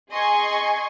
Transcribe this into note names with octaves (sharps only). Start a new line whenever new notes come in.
G#4 D#5 G#5 C6 C#6 G#6